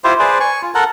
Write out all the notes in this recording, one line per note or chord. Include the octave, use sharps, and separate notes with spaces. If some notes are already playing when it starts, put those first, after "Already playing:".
E4 F4 G4 C5
G#4 B4 C5 D5
G#5 C#6
F4
A4 A#4 F#5